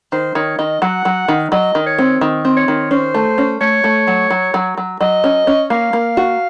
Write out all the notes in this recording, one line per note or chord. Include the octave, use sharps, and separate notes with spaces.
D#3 C5
D#3 C#5
D#3 D#5
F#3 F#5
F#3
D#3
F#3 D#5
D#3
C#5
C4
D#3
C4
C#5
D#3
C#4 C5
A3
C#4
A3 C#5
A3
F#3
F#3
F#3
F#3
F#3 D#5
C#4
C#4
A#3 F5
A#3
F#4